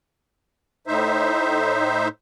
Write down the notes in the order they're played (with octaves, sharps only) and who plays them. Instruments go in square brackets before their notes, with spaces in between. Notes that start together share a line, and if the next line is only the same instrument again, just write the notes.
[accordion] A2 D#4 C5 E5